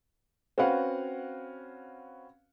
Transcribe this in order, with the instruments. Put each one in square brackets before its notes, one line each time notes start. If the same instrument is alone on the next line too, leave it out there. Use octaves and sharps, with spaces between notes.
[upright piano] C4 C#4 F#4 B4 F5 F#5